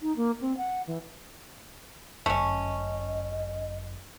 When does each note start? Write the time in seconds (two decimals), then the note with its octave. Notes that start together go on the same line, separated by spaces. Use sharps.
0.01 D#4
0.17 A#3
0.41 C4
0.57 F#5
0.87 E3
2.26 G1 F#2 A3 C#4 D#5